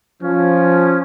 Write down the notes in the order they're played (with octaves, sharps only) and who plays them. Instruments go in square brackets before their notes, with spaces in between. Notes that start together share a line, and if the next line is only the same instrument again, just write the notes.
[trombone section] F3 [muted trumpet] C#4